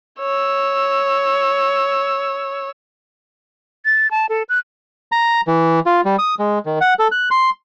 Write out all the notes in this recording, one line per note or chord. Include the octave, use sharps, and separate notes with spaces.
C#5 E6
A6
A5
A4
F#6
A#5
E3
F4
G3
D#6
G#3
D#3
F#5
A4
F#6
C6